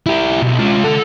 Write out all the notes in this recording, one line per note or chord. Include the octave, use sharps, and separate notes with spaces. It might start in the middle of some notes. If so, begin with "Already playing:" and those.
E4 G4
B1
G#3 F4
A4 F#5